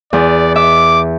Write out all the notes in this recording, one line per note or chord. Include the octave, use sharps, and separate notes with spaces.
E2 D5
E5 D6